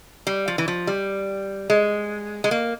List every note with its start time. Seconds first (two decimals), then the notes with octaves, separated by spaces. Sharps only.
0.27 G3
0.48 F3
0.58 E3
0.68 F3
0.87 G3
1.70 G#3
2.44 G#3
2.51 A#3